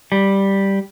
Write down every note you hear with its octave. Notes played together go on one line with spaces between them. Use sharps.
G3